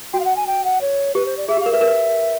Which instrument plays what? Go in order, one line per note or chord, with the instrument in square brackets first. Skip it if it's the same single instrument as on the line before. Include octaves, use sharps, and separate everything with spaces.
[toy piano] F#4 [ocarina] G5
[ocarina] F5
F#5
G#5
G5
F#5
C#5
[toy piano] G4 [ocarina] B4
[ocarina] C5
D5
[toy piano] G#4 [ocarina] E5
[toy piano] G4
[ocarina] F5
[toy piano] A#4
[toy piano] B4 [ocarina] E5
[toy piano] A#4
B4